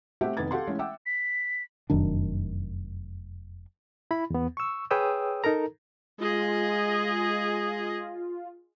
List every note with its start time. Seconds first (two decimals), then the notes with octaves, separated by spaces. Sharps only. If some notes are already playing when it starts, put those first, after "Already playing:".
0.21 A3 C4 G4 E5 F#5
0.37 F1 D#3 B3 B4 G#6 A6
0.51 G4 A4 F5 F#5 C6
0.67 E3 G#3 A3 C#4
0.79 E5 F#5 G5 D6 E6
1.06 B6
1.90 F1 F#2 D#3 D4
4.11 E4 B5
4.30 E2 B3
4.57 C#6 E6
4.91 G#4 B4 C#5 G5 D#6 E6
5.44 D#4 A4 A#4 A#5
6.20 G#3 F4 G#4 D#5